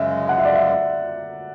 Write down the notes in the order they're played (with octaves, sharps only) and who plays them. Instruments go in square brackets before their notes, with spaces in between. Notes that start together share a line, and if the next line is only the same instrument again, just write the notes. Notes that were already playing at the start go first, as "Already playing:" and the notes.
Already playing: [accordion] F#2 C#3 G#3 [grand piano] E5
[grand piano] F#5
E5
D5
E5